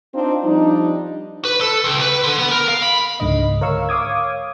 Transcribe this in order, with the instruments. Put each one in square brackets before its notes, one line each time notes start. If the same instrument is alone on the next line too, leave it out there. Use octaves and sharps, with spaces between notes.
[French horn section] C4 D4 D#4 F4
F3 G3 D4 D#4
[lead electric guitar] B4
A4
C#2
B4
D3
B3
A#4
F5
B5
[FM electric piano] C#2 G#2 D3 D#5
A#4 C#5 F5 C#6 E6
C#5 F5 D6 D#6 G#6